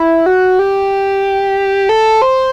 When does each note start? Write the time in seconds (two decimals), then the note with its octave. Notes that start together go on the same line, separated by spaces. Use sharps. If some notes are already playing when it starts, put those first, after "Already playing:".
Already playing: E4
0.26 F#4
0.59 G4
1.89 A4
2.22 C5